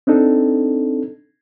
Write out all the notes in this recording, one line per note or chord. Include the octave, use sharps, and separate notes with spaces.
C4 D4 D#4 A4